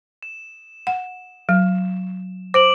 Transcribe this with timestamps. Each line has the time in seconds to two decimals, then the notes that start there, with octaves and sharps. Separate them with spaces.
0.23 E7
0.87 F#5
1.49 F#3
2.54 C5 D6 D7 F#7